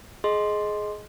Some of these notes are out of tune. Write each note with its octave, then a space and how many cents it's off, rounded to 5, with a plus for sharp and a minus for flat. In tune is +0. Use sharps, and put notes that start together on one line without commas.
G#4 +20 D#5 +0 C6 +0